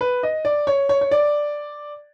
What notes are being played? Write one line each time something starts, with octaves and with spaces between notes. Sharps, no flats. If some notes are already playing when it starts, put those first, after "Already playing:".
B4
D#5
D5
C#5
C#5
C#5
D5